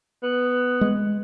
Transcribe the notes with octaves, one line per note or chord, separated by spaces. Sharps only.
B3
G#3